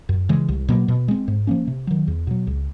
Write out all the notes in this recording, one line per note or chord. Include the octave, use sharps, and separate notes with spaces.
F#2
C#3 E3 G#3
C2
B2 F#3 A#3
B2
G#3 C4
G#2
F3 A#3 C#4
C3
D#3 F#3
E2
B2 F#3
C#2